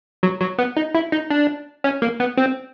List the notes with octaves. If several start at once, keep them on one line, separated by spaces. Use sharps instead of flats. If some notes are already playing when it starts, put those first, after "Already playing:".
F#3
F#3
B3
D#4
E4
D#4
D4
C#4
A#3
B3
C4